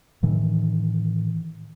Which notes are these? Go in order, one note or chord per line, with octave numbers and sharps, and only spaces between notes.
A2 D#3 E3